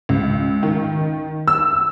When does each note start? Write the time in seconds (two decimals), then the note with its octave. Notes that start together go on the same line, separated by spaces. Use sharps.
0.09 C#2
0.63 D#3
1.48 E6